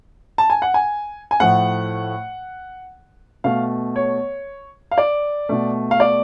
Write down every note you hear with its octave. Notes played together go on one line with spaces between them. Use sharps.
A5
G#5
F#5
G#5
G#5
A2 F3 A3 F#5
B2 A3 F5
C#5
F5
D5
B2 A3
F5
D5